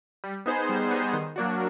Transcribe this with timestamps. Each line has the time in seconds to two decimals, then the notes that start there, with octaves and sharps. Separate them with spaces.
0.24 G3
0.46 B3 D#4 G#4 C5
0.69 G3
0.91 B3 D#4 G#4 C5
1.13 D#3
1.36 F#3 A#3 D4 F#4